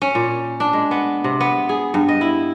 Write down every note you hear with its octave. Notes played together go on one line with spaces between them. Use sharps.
C#4
A#2
D4
G#3
B3
C3
B3
G#4
G2
D#5
E4